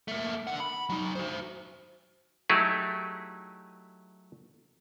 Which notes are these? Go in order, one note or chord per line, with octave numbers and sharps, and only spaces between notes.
A3 A#3
D3 F#5
B5
F#3 D#4
F#4 C5
F#3 A3 D#4 E4 G4 G#4